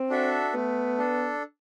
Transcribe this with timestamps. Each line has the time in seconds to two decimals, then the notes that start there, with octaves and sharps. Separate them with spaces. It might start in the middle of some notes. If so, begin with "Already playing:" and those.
Already playing: C4
0.09 D4 F#4 A4 E5
0.53 A3 B3
0.98 D4 A4